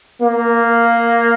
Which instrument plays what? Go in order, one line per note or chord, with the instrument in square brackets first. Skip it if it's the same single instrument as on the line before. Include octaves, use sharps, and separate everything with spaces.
[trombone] A#3